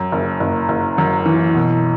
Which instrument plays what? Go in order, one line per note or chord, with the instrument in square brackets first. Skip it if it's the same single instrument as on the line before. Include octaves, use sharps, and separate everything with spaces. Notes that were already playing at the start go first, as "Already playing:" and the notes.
Already playing: [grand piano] F#2
F#1
F#1
F#1
F#2
E3
B2